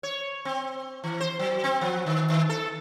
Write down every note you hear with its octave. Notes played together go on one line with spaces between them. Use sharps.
C#5
C4
E3
C5
F#3
C4
F3
D#3
D#3
A4